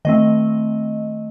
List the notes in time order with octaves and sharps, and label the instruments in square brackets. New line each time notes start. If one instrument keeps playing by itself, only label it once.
[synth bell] D#3 A3 C4 D#5